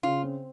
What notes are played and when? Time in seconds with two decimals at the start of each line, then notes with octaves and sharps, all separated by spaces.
0.03 C#3 F4
0.23 C4